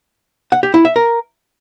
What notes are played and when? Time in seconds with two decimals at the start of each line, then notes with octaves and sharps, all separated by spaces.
0.52 F#5
0.63 G4
0.74 E4
0.85 E5
0.96 A#4